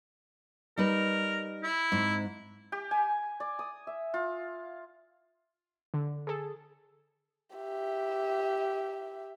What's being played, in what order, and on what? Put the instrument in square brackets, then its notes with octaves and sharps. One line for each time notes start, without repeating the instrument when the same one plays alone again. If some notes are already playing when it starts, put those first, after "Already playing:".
[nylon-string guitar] G3 D#4 B4 [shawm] A#4
[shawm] E4
[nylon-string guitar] G#2 C4
[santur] G4
G#5
D5
D#6
E5
F4
[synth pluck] D3
G#4 A4
[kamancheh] G4 E5